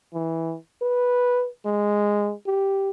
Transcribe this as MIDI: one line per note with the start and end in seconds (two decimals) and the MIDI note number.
0.14 0.55 52
0.82 1.48 71
1.66 2.33 56
2.46 2.91 67